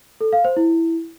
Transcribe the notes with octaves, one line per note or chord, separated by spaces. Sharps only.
A4
F5
C5
E4